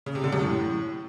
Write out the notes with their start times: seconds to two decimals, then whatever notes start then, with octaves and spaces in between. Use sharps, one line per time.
0.06 C#3
0.15 C3
0.24 D3
0.33 F#2
0.41 A2